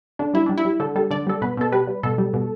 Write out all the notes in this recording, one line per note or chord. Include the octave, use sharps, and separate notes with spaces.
D3 D4
G3 E4
G3 D4
E4
G3
D3 A4
G3 A4
D3 D5
G3 A4
B2 B4
B2 A4
G3 B4
G3
B2 A4
G3
B2